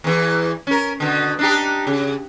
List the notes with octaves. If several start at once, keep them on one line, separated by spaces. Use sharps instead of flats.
E2 E3
C#4 A#4
B2 D3
D4 D#4 G4
C#3